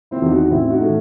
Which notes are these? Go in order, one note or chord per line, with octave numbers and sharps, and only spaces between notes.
C4 E4
E2 D#3
D#4 F#4
A1 C4 E4
D#4 F#4
A2 E3